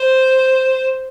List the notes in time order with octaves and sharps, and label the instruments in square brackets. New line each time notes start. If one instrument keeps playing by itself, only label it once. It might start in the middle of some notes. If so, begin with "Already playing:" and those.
Already playing: [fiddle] C5